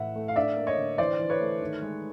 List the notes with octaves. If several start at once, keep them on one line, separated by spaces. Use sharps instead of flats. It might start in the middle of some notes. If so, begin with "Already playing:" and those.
Already playing: A2 E3 E5 F#5
A3
F5
D4 D5 E5
A#3
C#5 D#5
D3
E3 C5 D5
E3
B4 C#5
A3
D#3
G#3